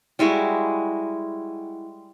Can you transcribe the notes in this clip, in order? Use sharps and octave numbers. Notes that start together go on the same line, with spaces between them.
G3 G#3 E4 F#4